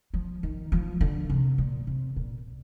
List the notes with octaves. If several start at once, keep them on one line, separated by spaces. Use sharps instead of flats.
F3
D#3
F3
D3
C3
A#2
C3
A#2